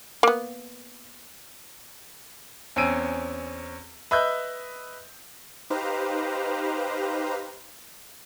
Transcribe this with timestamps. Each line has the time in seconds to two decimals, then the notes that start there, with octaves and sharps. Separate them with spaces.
0.23 A#3 B3
2.76 E2 C4 C#4 E6 D7 D#7
4.11 B4 D#5 E5 E6 F#6 G6
5.70 D#4 G4 B4 C5 F5 A#5